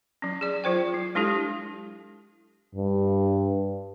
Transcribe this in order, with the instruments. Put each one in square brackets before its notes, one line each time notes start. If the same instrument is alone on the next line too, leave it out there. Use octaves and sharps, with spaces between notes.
[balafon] F#3 C#4
G#4 D5
F#3 F4 C5 G5
F#3
G#3 D4 E4 G4 A4
[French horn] G2